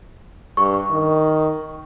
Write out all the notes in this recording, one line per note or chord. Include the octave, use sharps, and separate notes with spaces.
G2 C#6
D#3